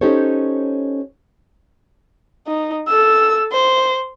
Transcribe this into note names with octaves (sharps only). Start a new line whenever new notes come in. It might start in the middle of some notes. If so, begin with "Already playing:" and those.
C#4 D#4 G4 A4 C5 C#5
D#4
A4 E6
C5